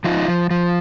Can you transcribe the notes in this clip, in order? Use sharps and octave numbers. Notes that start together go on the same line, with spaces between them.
F3 D#4 F4
F3
F3